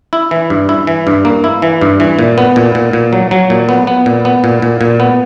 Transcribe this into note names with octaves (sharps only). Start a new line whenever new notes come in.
E4
E3
G2
E4
E3
G2
A#3
E4
E3
G2
E3
A#2
B3
A#2
A#2
A#2
F#3
F#3
A#2
B3
B3
A#2
B3
A#2
A#2
A#2
B3